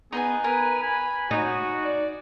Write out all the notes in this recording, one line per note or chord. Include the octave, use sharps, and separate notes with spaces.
B3 D#4 G#4 B4 G#5
A#4 B4 G#5
G#5 B5
D#4 F#4
D5